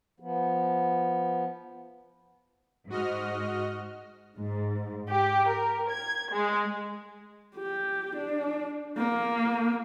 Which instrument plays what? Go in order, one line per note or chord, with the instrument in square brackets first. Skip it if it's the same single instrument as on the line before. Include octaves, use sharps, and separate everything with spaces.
[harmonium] F3 B3
[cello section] G#2 [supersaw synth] F#4 D#5 F6
[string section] G#2
G4
A#4
G#6
G#3
[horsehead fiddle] G4
D4
A#3